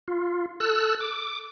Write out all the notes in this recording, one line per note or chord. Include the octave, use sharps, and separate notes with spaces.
F4
A4 E6 F#6
D6